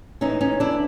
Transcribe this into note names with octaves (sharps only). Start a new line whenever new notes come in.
A2 E3 C#4 D#4
C#4 D#4
D4 E4